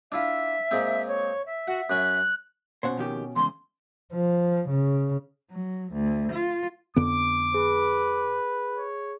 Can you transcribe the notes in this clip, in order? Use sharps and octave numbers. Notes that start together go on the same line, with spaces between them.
D4 E4 F4 E5
A#2 G#3 C4
C#5
E5
F#4 F#5
F#2 C#4 F#6
B2 C#4 C5 C#5 F#5
F2 D#3 G4
E2 G#2 C#3 C6
F3
C#3
F#3
D2
F4
F2 D3 B3 D6 D7
G#4 B4
C#5